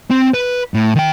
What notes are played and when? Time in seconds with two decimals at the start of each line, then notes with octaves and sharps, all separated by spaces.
0.10 C4
0.34 B4
0.74 A2
0.95 D#3 G5